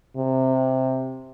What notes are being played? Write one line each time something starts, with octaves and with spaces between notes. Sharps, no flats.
C3